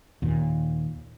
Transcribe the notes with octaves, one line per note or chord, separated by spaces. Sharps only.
D#2 A#2